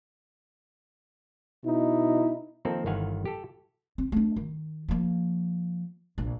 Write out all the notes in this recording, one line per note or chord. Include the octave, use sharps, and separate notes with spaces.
B2 D#4 E4
D#3 F3 A#3 C4 D#4 A4
G1 D#3 E3 F5 F#5 G#5
G4 A4
C4
A3 D4
D#3
F3 A#3
A#1